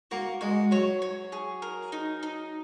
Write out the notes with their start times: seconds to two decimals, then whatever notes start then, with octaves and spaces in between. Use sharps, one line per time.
0.11 A#3 F#4
0.41 G#3 F#4
0.71 F#3 C#5
1.02 C#5
1.32 G#4
1.62 A#4
1.92 D#4
2.23 D#4